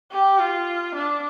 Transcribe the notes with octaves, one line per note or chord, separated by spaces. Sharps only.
G4
F4
D4